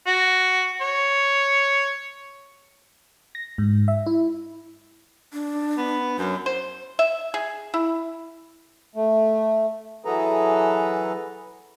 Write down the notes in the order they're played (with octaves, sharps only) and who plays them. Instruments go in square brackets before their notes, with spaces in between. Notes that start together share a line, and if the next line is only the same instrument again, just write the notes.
[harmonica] F#4
C#5
[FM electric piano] A#6
G#2
E5
E4
[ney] D4
[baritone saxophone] B3
[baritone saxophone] F#2 [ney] C#5
[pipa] C5
E5
G#4
E4
[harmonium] A3
E3 F#3 G#4 A4 B4 A#5